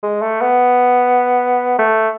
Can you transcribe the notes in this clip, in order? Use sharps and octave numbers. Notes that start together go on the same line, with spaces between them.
G#3
A3
B3
A3